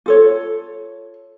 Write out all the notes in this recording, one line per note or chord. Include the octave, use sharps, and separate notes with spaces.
F4 A4 C#5